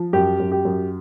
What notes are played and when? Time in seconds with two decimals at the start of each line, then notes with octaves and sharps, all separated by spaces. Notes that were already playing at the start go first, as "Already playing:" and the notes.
Already playing: F3
0.13 F#2 G4
0.40 F#2
0.52 G4
0.65 F#2